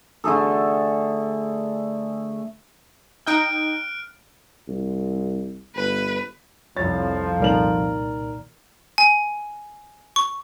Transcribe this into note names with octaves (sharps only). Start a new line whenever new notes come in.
D3 A3 G#4 A4
D#4 D#5 G5 F6 F#6 D7
C2
G1 B4
C2 F2 F3 C#5 A6
C2 A#2 D#3 A#4 D5 F#7
G#5
C#6